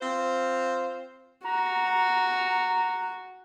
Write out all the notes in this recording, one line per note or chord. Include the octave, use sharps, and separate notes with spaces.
C4 F4 C5
F#4 A#5